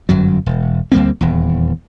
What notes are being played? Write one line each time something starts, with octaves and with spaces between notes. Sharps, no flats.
G1 F#2 F#3
E1
D2 G3 A#3 C4
D#1 E2